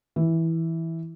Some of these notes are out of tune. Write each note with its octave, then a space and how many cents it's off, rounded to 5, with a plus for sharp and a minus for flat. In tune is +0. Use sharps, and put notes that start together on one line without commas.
E3 -10